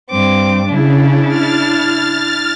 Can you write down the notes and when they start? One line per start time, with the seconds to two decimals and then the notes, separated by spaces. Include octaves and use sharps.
0.10 G2 C4 D6
0.69 C#3 D4 E4
1.27 F6 A6